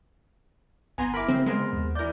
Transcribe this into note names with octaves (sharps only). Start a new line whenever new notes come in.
G1 B3 G#5 A#5 C6
E4 A#4 B5 D6
C#3 C4
G#3 B3 A#4 C5
D#2
E3 A#4 D5 G6